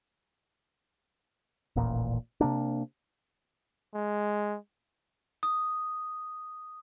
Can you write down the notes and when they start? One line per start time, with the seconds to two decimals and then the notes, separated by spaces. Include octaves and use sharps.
1.76 D#1 A1 A#2
2.41 C3 A#3 D4
3.95 G#3
5.43 D#6